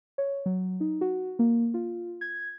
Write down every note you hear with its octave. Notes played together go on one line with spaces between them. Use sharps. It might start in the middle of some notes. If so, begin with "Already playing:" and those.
C#5
F#3
D#4
F#4
A#3
F4
G#6